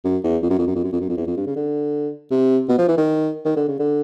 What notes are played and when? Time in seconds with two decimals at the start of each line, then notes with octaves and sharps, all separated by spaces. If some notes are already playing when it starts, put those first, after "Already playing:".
0.04 F#2
0.24 E2
0.42 F2
0.50 F#2
0.58 F2
0.67 F#2
0.75 F2
0.83 F#2
0.92 F2
1.00 F#2
1.09 F2
1.17 E2
1.27 F2
1.36 G2
1.46 C#3
1.56 D3
2.31 C3
2.69 B2
2.78 F3
2.88 E3
2.97 D#3
3.45 D#3
3.56 D3
3.68 C#3
3.79 D3